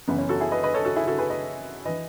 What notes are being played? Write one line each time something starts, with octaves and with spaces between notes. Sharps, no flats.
F#1 F#2 E3 B3
C#4
F#4 A4
E4 G#4
B4 D#5
B4 D#5
A4 C#5
F#4 A4
E4 G#4
F#4 A4
G#4 B4
B4 D#5
E3 B4 D#5